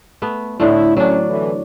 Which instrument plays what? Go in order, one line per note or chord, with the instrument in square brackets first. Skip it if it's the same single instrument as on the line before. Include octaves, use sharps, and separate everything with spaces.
[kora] A3 B3
[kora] A2 D3 A3 [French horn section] E4
[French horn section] D2 C#4 C#5 [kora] F#3 D4
[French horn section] D3 E3